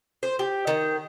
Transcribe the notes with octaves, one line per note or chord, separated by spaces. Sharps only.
C5
G4
D#3